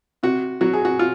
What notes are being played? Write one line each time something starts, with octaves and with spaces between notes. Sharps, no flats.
C3 F#4
F#3 F#4
G#4
F#4
F4